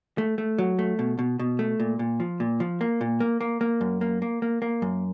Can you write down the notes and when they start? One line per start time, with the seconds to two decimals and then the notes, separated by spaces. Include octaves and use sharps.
0.18 A3
0.38 A3
0.58 F#3
0.79 A3
0.99 B2
1.19 B2
1.39 B2
1.59 A3
1.80 A#2
1.99 A#2
2.20 F3
2.40 A#2
2.60 F3
2.81 A#3
3.01 A#2
3.20 A#3
3.41 A#3
3.61 A#3
3.81 F#2
4.01 A#3
4.22 A#3
4.42 A#3
4.62 A#3
4.82 F#2